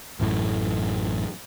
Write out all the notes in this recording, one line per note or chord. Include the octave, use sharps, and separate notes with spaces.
A1 F#2 A2